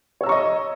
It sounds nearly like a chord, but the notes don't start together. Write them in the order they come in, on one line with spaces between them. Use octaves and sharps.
C#5 E6 A#5 C#6 D#5